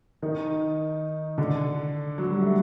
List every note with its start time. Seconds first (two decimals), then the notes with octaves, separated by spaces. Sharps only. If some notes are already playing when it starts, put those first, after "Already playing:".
0.22 D#3 D#4
1.38 D3 D4
2.18 F#3
2.30 G3
2.42 A3